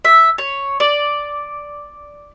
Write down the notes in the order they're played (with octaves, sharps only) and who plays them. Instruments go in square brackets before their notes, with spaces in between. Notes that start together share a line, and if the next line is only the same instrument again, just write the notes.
[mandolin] E5
C#5
D5